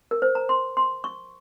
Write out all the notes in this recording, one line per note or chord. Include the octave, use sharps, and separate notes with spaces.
A#4
C5
A#5
C6
C6
C#6